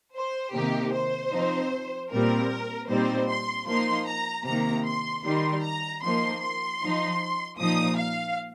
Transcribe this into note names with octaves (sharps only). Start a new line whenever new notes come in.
C5
C3 D#3 A#3 D#4 G4
C5
F3 C4 D#4
A#2 G3 C4 A#4
A#2 G3 C4 D#4 C5
C6
F3 A#3 D#4 C6
A#5
C3 D#3 A#3 A#5
C6
D#3 G3 D#4 C6
A#5
F3 A#3 D#4 C6
C6
F3 D#4
A#2 F3 D#4 D#6
F5